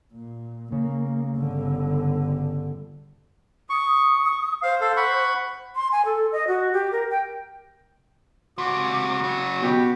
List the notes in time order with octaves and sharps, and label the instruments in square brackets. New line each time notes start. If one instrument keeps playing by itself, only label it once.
[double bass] A#2
[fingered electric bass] C#3 [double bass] A#3
[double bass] G1 D3
[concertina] C#6 [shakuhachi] D#6
[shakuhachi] C5 [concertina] F5
[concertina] A4 F5
F#5 B5 C#6
[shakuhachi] C6
G#5
A4
D#5
F#4
G4
A#4
G5
[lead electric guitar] C#2 C3 [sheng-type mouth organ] F#4 [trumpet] D6
[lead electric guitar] C#3 F#3
[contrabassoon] B2 [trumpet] G4